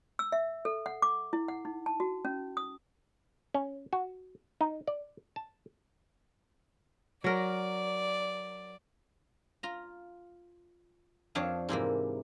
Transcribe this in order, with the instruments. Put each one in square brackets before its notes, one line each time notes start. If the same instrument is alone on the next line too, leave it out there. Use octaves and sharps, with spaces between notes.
[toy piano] E6
E5
A4
F#5
D6
E4
F#5
D#4
A5
F#4
C#4
D#6
[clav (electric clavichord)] C#4
F#4
D#4
D5
A5
[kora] F#3 A#4 [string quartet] D5
[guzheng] F4 A#5
F2 F3 D4 C#5 F5
G#2 C3 E3 A#3